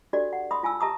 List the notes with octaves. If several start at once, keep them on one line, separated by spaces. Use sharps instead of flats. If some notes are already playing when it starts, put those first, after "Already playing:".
D4 F#4 G4 A4 D5
F#5
E5 B5 C6 D#6
F4 G#5 A5 E6
G4 E5 A5 A#5 C#6 D#6